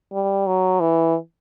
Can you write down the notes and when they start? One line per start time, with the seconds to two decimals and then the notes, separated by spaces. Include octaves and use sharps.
0.13 G3
0.47 F#3
0.80 E3